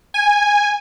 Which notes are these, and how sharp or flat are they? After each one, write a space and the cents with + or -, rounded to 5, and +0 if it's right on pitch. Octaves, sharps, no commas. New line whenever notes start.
G#5 -10